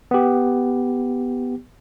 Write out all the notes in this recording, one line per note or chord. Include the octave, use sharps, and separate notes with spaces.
B3 G4